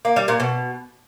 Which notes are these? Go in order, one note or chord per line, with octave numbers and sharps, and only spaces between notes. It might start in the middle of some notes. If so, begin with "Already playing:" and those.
A#3
G3
A#2
B2